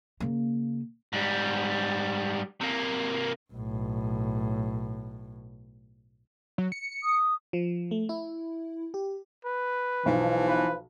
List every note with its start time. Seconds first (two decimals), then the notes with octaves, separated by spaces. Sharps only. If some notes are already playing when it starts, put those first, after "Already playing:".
0.20 C#3 A#3
1.13 G#2 G3
2.61 C3 A#3
3.52 B1 A2
6.58 F#3
6.72 C#7
7.03 D#6
7.53 F3
7.91 A3
8.09 E4
8.94 G4
9.45 B4
10.06 B1 E3 F3
10.48 B4